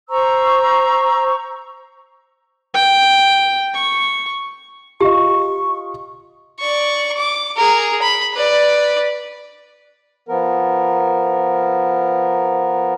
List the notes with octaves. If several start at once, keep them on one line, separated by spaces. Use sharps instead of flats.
C5 A#5 C#6 E6
G5
C#6
F4 G4 D#5 C#6
D5 C#6
D6
G#4 A#4
B5
B4 D5
F3 B3 A#4